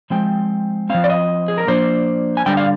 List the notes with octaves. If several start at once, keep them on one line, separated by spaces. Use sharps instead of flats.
F3 G#3 C4 G5
F3 C4 F5
D5
D#5
G#4
A#4
F3 A#3 D4 C5
G#5
D3 G3 D4 G5
F5